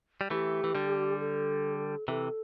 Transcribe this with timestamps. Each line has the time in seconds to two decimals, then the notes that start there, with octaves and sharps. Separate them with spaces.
0.21 G3
0.30 E3 A3 G4
0.64 E3
0.75 D3 G3
1.19 A4
2.08 C3 E3 A4